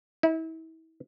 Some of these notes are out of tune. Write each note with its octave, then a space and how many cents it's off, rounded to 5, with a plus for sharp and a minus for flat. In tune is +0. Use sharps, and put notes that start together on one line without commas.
E4 -35